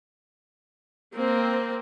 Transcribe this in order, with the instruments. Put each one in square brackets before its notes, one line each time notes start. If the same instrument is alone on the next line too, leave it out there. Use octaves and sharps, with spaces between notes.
[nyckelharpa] A#3 [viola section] C4